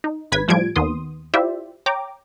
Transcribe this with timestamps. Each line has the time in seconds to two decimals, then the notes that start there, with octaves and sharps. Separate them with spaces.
0.04 D#4
0.32 G#1 B4 G#6 B6
0.48 A2 F3 G3 G#6 D7
0.76 D#2 D#3 B3 C6 D#6
1.34 E4 F4 G4 C5 D5 E5
1.86 C#5 G5 A#5 D6